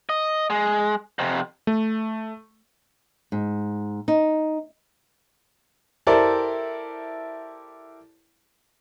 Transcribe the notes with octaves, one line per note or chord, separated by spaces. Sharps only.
D#5
G#3
F2 C3
A3
G#2
D#4
E4 G4 A4 A#4 C5 D5